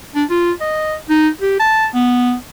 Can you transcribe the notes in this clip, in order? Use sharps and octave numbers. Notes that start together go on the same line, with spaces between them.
D4
F4
D#5
D#4
G4
A5
B3